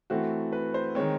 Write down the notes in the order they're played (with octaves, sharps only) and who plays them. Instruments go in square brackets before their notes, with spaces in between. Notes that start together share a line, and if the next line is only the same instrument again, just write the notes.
[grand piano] E3 A3 C4 F#4
B4
C5
D#3 G#3 C4 C#5